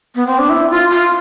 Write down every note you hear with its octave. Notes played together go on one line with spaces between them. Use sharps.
B3
C4
D4
E4
F4
F4